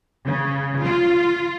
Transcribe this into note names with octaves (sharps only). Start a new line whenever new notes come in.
C#3
F4